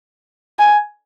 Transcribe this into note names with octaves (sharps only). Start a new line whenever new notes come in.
G#5